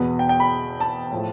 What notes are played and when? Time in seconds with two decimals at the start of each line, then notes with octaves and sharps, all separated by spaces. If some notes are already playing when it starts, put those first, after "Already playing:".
Already playing: E2 B2 B3
0.19 G5
0.29 G5
0.40 B5
0.80 A5
1.12 A2 F3 A3